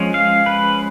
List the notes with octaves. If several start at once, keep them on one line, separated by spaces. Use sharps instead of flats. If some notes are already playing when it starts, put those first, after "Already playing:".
Already playing: F3 G#3 C#4
F5
B4